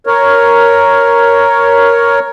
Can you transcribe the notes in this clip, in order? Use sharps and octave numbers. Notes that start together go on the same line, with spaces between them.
A#4 C#5